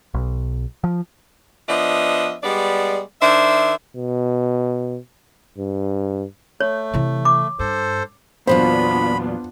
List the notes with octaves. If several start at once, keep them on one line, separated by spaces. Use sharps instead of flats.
B1
F3
F3 B3 D4 D#5 E5
G3 G#3 B3 D5
D#3 D4 C5 E5
B2
G2
A3 C#5
C3 E3
D6
G2 A4 C5
E2 A#2 F#3 B3 D4 F4 C5 B5